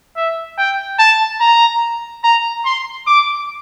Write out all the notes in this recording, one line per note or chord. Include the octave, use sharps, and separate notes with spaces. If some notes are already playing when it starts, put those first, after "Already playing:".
E5
G5
A5
A#5
A#5
C6
D6